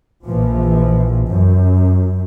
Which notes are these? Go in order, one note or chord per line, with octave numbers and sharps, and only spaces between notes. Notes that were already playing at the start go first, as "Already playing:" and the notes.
A#1 E3 F3
F#2